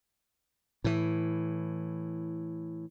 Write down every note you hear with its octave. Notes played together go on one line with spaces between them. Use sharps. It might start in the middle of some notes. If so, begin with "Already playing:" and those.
A2 E3